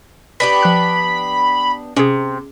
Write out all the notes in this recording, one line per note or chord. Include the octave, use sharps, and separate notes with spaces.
B3 D4 G4 B5
F3 F#6
C3 C#4 G#4